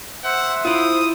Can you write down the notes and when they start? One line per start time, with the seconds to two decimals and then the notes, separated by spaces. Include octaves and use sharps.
0.24 C5 E5 F#5
0.65 E4 F4 D#6